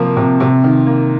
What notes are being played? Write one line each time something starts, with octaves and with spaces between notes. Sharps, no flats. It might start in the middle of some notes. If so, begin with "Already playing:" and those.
Already playing: C3 F3 A#3
C3
C3
D#3
A#3